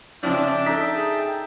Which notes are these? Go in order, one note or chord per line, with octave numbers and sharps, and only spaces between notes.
C#3 F3 D4 E5 G5 A5
D#4 A4 B6
G#4